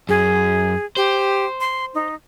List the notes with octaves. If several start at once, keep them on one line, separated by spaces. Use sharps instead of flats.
F#2 G#4
G4 C5
C6
D#4